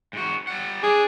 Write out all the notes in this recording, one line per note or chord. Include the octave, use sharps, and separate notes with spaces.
G#2 F#4
G3 F#5
D4 G#4